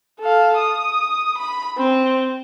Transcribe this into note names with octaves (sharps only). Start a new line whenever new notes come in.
A4 F5
D#6
B5
C4